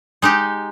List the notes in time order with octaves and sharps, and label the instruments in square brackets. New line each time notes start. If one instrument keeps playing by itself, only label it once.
[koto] G#3 D#4 G4